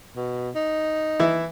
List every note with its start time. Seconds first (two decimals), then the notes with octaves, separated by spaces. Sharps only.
0.16 B2
0.55 D#4
1.20 E3 E4